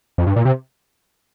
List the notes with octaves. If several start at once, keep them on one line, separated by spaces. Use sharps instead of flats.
F2
G2
A#2
C3